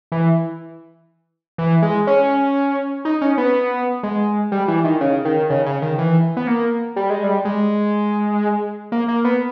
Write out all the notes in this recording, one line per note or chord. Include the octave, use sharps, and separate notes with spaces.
E3
E3
G#3
C#4
D#4
C#4
B3
G#3
G3
E3
D#3
C#3
D#3
C#3
C#3
D#3
E3
B3
A#3
G3
G#3
G3
G#3
A#3
A#3
B3